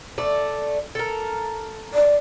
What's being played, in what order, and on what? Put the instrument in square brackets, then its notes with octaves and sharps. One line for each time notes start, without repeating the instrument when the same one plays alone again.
[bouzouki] A3 D5
A4 A#4
[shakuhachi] D5